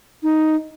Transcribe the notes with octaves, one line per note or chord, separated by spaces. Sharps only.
D#4